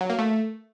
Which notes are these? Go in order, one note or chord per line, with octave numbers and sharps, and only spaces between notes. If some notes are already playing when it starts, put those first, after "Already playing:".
F#3
A#3
A3